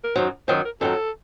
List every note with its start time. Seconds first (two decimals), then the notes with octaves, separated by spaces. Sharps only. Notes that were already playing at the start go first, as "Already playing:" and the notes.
0.04 A#4
0.15 F#2 D#3 F#3 C5
0.48 F#2 D#3 F#3 C5
0.65 A#4
0.81 F#2 D#3 F#3 A4